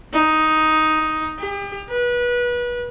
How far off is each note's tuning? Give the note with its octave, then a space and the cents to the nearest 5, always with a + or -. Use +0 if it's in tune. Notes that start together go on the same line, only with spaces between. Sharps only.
D#4 +5
G4 +35
B4 -25